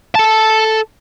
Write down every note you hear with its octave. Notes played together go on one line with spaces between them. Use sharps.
A4 A5